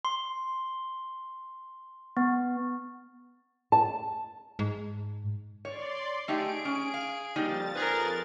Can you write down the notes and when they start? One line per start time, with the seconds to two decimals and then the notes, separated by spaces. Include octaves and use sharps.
0.05 C6
2.17 B3
3.72 A5
4.59 G#2
5.65 C#5 D5 C6
6.28 A3 D#4 G4 G#4 D7
6.65 C#4
6.94 F5
7.36 F2 G3 A#3 D#4 A6
7.75 G#4 A#4 B4